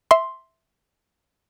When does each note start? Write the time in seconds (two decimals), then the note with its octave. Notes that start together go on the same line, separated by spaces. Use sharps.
0.11 E5 C6